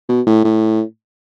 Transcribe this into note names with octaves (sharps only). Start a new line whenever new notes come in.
B2
A2
A2